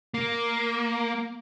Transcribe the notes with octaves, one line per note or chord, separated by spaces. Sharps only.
A#3